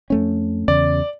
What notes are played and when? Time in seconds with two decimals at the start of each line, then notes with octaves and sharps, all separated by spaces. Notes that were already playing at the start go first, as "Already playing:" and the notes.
0.10 F2 A3 C#4
0.68 E2 C#3 D5